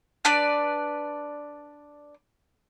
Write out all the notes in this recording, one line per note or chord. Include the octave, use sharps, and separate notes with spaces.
D4 B4 D5